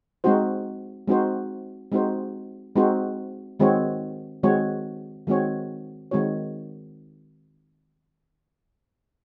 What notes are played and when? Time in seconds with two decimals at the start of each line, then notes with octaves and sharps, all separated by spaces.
0.24 G#3 C4 D#4 F#4 C5
1.08 G#3 C4 D#4 F#4 C5
1.92 G#3 C4 D#4 F#4 C5
2.76 G#3 C4 D#4 F#4 C5
3.60 D#3 G#3 C4 F#4 C#5
4.43 D#3 G#3 C4 F#4 C#5
5.27 D#3 G#3 C4 F#4 C#5
6.11 D#3 G#3 C4 F#4 C#5